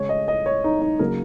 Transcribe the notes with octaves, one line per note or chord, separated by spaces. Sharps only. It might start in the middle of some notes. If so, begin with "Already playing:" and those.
Already playing: C#3 G#3 C#5
D#5
D#5
C#5
D#4
D#4
C#3 F#3 A#3 A#4